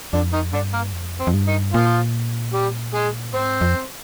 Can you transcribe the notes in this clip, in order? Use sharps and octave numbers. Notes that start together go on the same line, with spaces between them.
F2 D3 D4
D#3 D#4
G2 D3 D4
A#3
F2
C4
F2
G2
D#3 D#4
A#2 F3 F4
G3 G4
G#3 G#4
G#2 C4 C5
F2